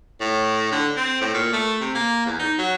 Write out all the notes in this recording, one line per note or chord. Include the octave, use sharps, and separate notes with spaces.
A2
D3
C4
A2
A#2
A3
C3
A#3
E2
D#4
F#3